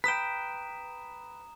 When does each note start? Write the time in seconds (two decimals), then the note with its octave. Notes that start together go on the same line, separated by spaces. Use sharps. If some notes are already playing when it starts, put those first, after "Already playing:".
0.04 B4 G5 A#5 D#6 B6 E7